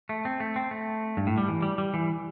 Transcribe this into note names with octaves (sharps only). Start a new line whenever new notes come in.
A3
C4
A3
C4
A3
G2
A2
G3
E3
G3
G3
E3